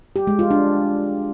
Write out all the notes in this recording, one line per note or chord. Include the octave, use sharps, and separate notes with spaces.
G4
G#3
F4
D4